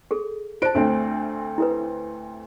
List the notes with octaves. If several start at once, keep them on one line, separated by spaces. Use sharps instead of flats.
G#4 A4
F4 C5 A5 D7
D2 A3 C4
E4 A4 B4